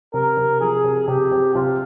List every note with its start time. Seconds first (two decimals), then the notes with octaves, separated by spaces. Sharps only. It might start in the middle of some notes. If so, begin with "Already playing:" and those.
0.14 C3 A#4
0.37 C3
0.61 F3 G#4
0.84 C3
1.08 C3 G4
1.31 C3
1.55 C3 F4